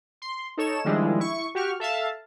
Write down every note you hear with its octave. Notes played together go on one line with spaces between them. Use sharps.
C6
D#4 A4 C#5 E7
D#3 F3 G3 G#3 D4 E4
E4 C#6
F#4 G4 C#6 F6
A4 E5 F5 A5